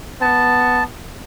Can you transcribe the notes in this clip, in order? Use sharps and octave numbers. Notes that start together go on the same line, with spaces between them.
B3 A5